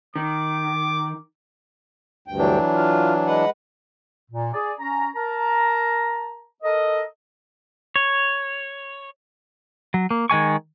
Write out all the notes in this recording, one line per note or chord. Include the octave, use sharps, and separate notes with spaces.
D#3 D6
D2 G2 G5
E3 F#3 D4
F4
G#3 B4 F#5
A#2
G#4 D5
C#4 A#5
A#4 A5 A#5
A4 A#4 D#5
C#5
F#3
A#3
D#3 G#3 G#5 C#6